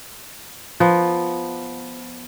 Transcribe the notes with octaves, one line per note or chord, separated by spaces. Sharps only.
F3 B3